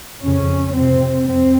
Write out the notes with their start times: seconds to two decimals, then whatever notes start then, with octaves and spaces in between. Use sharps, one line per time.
0.24 F2 C#3 C#4
0.76 F2 C3 C4
1.28 F2 C4